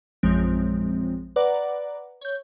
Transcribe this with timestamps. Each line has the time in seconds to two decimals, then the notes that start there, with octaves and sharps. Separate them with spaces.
0.23 A#1 F#2 F3 G#3 C4
1.36 B4 D5 F#5 A#5 D6
2.21 C#5 G6